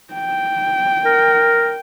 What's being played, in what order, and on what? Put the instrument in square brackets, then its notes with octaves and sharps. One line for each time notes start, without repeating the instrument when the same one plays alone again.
[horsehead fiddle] G5
[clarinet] A#4